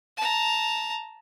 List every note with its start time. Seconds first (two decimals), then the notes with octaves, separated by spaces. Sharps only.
0.17 A5 A#5